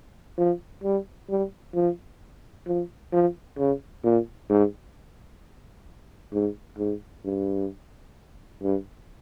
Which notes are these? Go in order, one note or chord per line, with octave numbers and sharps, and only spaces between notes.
F3
G3
G3
F3
F3
F3
C#3
A#2
G#2
G#2
G#2
G2
G2